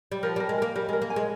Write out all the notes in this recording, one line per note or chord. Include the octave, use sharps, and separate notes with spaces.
G3
F3 A#4
G3 A#4
G#3
A#3 A#4
G3 A#4
G#3 A#4
A#3
G#5
G#3